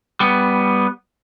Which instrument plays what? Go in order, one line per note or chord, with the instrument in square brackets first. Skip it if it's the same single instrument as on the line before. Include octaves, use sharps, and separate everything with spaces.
[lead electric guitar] G3 B3